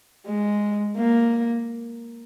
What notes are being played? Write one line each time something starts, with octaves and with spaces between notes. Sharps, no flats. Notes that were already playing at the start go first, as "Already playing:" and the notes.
G#3
A#3